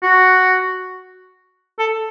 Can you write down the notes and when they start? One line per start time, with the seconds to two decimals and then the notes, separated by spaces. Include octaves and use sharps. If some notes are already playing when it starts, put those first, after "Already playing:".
0.03 F#4
1.79 A4